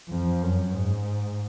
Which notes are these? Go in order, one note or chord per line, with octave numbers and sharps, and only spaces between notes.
F2
F#2
G#2